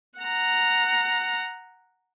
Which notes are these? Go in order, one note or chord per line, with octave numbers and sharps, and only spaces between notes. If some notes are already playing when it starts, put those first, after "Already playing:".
F#5 A#5